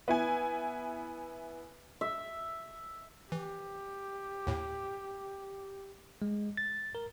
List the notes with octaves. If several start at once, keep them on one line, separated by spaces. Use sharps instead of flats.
B3 E4 G#5
E5
E3 G4
D#2 A2
G#3
A6
A#4